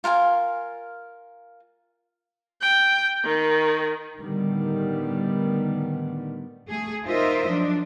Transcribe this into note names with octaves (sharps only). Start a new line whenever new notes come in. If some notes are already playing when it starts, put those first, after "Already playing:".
F4 A#4 F5 G#5
G5
D#3
A2 D3 D#3 G3 B3
A3 G#4
D#4 F4 A#4 C5 D#5 E5
F3 F#3 D4